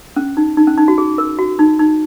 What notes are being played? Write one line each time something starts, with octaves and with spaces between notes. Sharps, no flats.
C#4
D#4
D#4
C#4
D#4
F#4
G#4
A#4
F#4
D#4
D#4